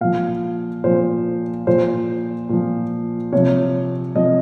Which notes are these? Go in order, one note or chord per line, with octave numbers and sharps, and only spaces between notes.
A#2 F3 F5
A#2 F3 C5
A#2 F3 C5
A#2 F3
C3 F3 C#5
C3 F3 D#5